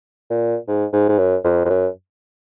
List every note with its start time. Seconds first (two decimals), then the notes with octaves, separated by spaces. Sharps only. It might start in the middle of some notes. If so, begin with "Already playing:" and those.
0.30 A#2
0.68 G#2
0.93 G#2
1.09 G#2
1.18 F#2
1.44 F2
1.65 F2
1.70 F#2